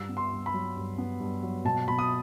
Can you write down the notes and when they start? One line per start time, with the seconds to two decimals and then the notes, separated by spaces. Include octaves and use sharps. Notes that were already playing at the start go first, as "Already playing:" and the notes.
Already playing: G2 E6
0.09 B3
0.17 C6
0.32 G2
0.46 B5
0.54 F#3
0.76 G2
0.98 B3
1.20 G2
1.43 F#3
1.65 B2 A5
1.87 B2 B5
1.99 D#6